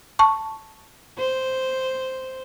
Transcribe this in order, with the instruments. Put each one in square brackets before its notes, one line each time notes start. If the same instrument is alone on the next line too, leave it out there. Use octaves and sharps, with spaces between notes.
[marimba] A5 C#6
[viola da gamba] C5